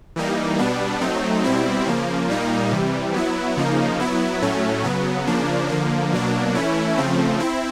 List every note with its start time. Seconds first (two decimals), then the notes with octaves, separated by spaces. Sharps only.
0.16 E3 G3 A#3 D#4
0.58 B2 G3 B3 D4
1.01 F#3 A3 C4 D#4
1.44 B2 G3 C4 E4
1.86 C#3 F3 A#3
2.29 A#2 G3 A#3 D#4
2.71 C3 E3 G3
3.14 F#3 B3 E4
3.57 C#3 F3 A#3 D#4
4.00 F#3 B3 E4
4.42 A2 F#3 A3 C#4
4.84 C#3 F#3 B3
5.27 C#3 F3 A#3 D4
5.69 D3 F3 A#3
6.12 B2 F#3 A#3 D4
6.55 E3 A3 C#4 E4
6.97 C#3 F3 A3 C4
7.40 C4 E4